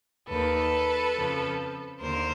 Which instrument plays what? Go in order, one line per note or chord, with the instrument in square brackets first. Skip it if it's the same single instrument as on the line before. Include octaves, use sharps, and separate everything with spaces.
[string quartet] D#2 D#3 A4 B4
F2 C#3 F3
D#2 D3 A#4 C5